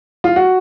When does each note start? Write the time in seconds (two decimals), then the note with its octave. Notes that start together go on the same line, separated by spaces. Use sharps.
0.24 F4
0.36 F#4